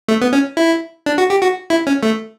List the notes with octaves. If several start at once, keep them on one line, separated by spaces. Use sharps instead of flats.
A3
B3
C#4
E4
D4
F#4
G4
F#4
E4
C#4
A3